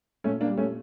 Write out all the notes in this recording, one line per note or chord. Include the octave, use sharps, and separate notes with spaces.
A#2 A3 C#4
A#3 D4
G3
A3 C#4